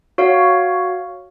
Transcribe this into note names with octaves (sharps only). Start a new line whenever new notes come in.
F#4 C#5 F5